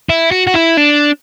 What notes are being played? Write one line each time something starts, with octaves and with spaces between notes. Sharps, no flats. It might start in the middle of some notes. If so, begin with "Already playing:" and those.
E4
F#4
F#4
E4
D4